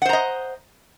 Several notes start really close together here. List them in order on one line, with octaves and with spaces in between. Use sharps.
F#5 C5 A#5 D#5